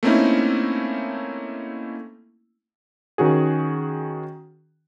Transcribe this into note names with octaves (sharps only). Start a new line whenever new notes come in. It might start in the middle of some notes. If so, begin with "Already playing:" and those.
A3 A#3 C4 C#4 D#4 E4
D#3 C#4 F#4 G#4